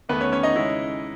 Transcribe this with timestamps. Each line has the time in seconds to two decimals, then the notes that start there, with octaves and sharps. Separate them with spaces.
0.09 E2 D#3 A3 B3 B4
0.21 C#4 C#5
0.32 C#4 C#5
0.43 D#4 D#5
0.55 C#3 G#3 C#4 E4